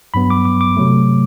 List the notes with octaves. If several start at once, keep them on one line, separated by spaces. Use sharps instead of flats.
G2 F#3 B3 B5
D6
D6
D6
C3 F#3 A3